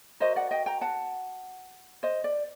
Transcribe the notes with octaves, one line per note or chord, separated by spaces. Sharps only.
F#4 A#4 C5 D#5
D5 F#5
D#5 G5
G5 A#5
F#5 A5
C5 D#5
D5